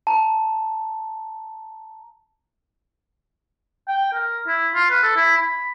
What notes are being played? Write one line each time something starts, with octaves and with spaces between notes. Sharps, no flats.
A5 A#5
G5
A#4
E4
F4
B4
A4
E4
B5